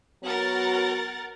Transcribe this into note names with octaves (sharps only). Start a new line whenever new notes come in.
F#3 B3 F#4 A#4 F#5 A6